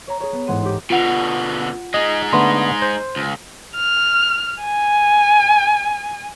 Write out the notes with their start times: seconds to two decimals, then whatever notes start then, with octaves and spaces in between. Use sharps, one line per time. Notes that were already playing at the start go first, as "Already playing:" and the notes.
0.07 C#5 A#5
0.20 G#4 C#5
0.32 B3
0.47 A1 G#2 G#3 F#5 C6 D#7
0.62 D#4 G4
0.90 B2 D3 F4 F#5 F7
1.94 G#3 D#4 D#5
2.33 D3 A3 B3 C6
2.82 C5
3.16 C#2
3.76 F6
4.63 G#5